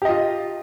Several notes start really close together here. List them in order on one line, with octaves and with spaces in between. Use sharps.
G4 D#5 F4